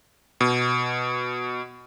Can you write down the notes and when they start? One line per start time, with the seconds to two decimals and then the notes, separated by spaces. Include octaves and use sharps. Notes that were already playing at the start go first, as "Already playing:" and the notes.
0.41 B2